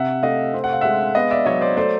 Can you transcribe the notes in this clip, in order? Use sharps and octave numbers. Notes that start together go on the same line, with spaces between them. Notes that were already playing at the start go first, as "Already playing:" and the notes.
Already playing: C3 E5 F#5
A3 D#5 F5
C4
F#5
F5
G#3 E5 F#5
B3 D#5 F5
D5 E5
F#3 C#5 D#5
C5 D5
A3 C5 D5